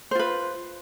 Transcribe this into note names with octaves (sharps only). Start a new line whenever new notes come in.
F4 B4 C5